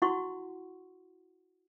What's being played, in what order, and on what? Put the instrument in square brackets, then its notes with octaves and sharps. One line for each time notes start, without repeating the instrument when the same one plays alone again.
[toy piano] E4 F#4 F#5 C6 C#6